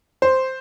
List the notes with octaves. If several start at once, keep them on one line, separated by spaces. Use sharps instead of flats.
C5